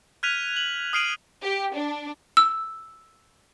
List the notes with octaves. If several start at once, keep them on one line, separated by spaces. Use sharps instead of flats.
F6 F#6 G#6 B6 D#7 F7
F#7
D#6 F6 C7 D7 D#7 F#7
G4
D4
E6